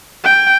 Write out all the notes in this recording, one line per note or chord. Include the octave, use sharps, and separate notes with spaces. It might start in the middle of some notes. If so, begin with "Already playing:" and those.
G5